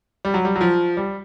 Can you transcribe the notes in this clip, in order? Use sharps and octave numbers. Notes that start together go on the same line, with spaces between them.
G3
F#3
G3
F#3
F3
G3